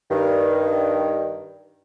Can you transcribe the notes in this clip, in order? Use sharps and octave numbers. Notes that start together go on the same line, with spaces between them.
G2 D#3